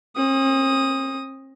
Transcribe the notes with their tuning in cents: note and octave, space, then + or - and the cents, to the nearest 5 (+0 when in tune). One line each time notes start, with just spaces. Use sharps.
C4 +45 D#6 +0